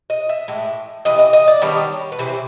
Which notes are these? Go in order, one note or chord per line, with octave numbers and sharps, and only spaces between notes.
D#5
E5
A2 E3 G#3
C3 E3 D#5
D#5
D#5
D5
D#3 G3 B3 D4 C#5
B4
C3 E3 C5